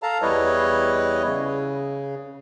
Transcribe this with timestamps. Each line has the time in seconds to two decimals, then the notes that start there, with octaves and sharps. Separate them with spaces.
0.03 A4 F5 A5 A#5
0.22 E2 G3 E4 B4 C#5 D#5
1.26 C#3